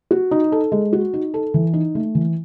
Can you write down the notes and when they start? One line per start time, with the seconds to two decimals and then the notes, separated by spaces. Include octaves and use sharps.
0.11 F#4
0.31 D#4
0.52 A4
0.72 G#3
0.93 F#4
1.14 D#4
1.34 A4
1.54 E3
1.73 D#4
1.95 A3
2.15 E3